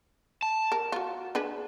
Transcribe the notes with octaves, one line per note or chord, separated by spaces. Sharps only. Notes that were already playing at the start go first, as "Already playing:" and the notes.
A5
A#4
F4 F#4
D4 G#4 B4